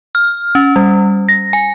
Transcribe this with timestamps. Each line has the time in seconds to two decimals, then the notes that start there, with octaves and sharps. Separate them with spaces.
0.15 F6
0.55 C#4
0.76 G3
1.29 A#6
1.53 G#5